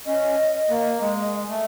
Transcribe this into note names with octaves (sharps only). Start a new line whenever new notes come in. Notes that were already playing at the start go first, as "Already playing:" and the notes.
C#4 D#5
A#3
G#3
A3